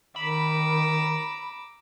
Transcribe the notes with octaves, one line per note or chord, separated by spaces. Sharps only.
D#3 A#5 B5 D6 E6